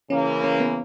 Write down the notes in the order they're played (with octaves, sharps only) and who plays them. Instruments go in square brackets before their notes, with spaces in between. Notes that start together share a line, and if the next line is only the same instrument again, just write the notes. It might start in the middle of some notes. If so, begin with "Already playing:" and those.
[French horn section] C#3 E3 A#3 [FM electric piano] C#4
[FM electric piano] C#4
B3